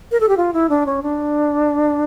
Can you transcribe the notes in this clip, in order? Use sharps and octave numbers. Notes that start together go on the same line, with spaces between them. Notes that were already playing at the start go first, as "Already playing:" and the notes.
A#4
A4
G4
F4
E4
D4
C#4
D4